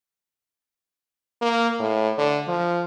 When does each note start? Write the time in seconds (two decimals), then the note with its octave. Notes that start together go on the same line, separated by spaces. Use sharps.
1.42 A#3
1.80 A2
2.18 D3
2.48 F3